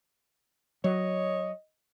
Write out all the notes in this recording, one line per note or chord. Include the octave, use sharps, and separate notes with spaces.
F#3 C#5 D#5